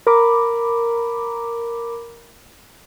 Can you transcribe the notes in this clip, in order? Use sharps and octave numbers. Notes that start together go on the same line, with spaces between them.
A#4 A#5 B5 D6